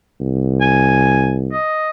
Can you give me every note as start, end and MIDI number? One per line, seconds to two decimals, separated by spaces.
0.20 1.53 36
0.61 1.33 80
1.52 1.90 75